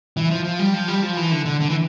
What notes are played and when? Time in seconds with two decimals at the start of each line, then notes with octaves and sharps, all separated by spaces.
0.17 E3
0.30 F3
0.44 F3
0.59 G3
0.74 F3
0.88 G3
1.02 F3
1.17 E3
1.32 D3
1.45 D3
1.60 D3
1.69 E3